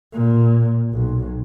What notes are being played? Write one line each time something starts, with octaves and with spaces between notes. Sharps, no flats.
A#2
B1